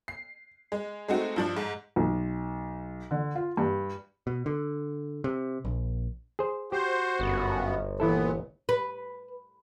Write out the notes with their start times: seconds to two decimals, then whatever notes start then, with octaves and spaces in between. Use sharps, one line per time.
0.08 C7
0.72 G#3
1.08 G#3 A3 C4 D#4 F#4
1.36 G2 F3 D4
1.56 G#2
1.96 B1
3.11 D3
3.35 F4
3.57 G2
4.27 B2
4.46 D3
5.24 C3
5.65 A#1
6.39 G#4 C5
6.72 F#4 G4 C5
7.20 G1 F#2 B3
8.00 A#2 E3 B3 E4 A4
8.69 B4